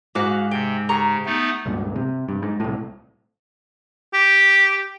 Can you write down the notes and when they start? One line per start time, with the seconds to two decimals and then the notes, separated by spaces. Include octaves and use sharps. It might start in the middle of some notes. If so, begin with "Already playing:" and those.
0.15 G#2 F#4 F5 D6
0.51 C3 G5
0.89 C#3 G4 A#5 C#6
1.26 A3 B3 D#4
1.66 C#2 G2 A#2
1.96 C3
2.28 G2
2.42 G#2
2.60 C2 A2
4.14 G4